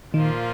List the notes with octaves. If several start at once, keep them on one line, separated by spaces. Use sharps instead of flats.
A#2 D#3 F3 A#3 F4